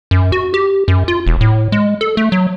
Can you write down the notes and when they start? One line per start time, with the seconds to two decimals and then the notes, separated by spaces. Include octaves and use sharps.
0.11 F#2
0.32 F#4
0.54 G4
0.88 F#2
1.08 F4
1.26 E1
1.41 A2
1.72 G#3
2.01 A4
2.17 A3
2.32 F#3